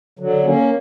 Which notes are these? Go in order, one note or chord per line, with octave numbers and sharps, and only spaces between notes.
D3 F#3
A#3 C#4